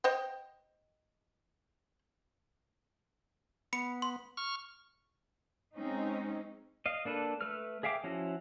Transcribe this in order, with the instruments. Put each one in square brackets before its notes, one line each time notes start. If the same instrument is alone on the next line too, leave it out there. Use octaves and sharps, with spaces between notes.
[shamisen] C5 D#5 G5
[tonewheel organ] B3 [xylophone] B5 C#7
[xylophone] C6
[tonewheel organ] C#6 F6
[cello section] G#3 C4 C#4 D#4
[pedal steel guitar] D#5 F5
A#3 D4 A4 B4
A3 B4 E6 F6
G#4 E5 F5 G5 D6
F3 C#4 E4 F#4